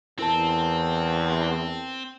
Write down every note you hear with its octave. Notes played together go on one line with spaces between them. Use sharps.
E2 C4 E4 A#4 A5